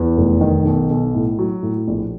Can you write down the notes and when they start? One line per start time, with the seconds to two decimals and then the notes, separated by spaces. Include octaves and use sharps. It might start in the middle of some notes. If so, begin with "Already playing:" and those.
Already playing: E2
0.17 F1
0.41 D#3
0.65 B1
0.90 B1
1.14 A2
1.39 F#3
1.62 A2
1.88 A#1